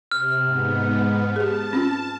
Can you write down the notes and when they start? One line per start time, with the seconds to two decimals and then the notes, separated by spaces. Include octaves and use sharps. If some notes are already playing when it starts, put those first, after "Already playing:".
0.11 C3 F6
0.44 G#2 B3
1.36 G4 G#4 A5
1.73 C4 C#4 F4